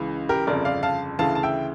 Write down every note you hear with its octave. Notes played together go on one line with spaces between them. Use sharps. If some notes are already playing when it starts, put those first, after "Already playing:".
Already playing: C#2 C#3 E3
G4 A#4
G1 F2 C#3 A#4 D5
D5 F5
F5 A5
D2 C#3 E3 F5 A5
A5
E5 G5